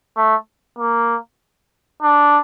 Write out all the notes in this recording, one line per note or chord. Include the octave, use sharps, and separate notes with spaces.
A3
A#3
D4